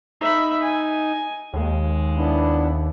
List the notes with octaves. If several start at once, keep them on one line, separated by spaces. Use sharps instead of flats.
D#4 E5 B5
G#5
D#2 G#3
B3 D4 E4